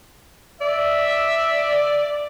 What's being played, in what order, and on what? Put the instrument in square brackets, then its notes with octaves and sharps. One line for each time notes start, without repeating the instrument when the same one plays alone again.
[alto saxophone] D5 [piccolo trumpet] E5